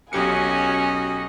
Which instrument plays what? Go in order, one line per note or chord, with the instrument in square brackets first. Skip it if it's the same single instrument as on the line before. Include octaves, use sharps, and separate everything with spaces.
[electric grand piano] B1 G4 C#7 [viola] C#4 [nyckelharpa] F#4 D#5 [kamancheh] G#5